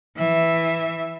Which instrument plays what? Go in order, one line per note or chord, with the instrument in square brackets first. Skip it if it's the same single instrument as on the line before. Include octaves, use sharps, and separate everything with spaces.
[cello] E3 E5